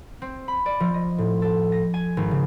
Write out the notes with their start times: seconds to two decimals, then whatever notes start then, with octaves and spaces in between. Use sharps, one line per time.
0.22 C4
0.48 B5
0.66 D5
0.80 F3
0.94 D#5
1.18 A2
1.42 A4
1.72 A#6
1.94 G#5
2.17 G#1
2.31 C#3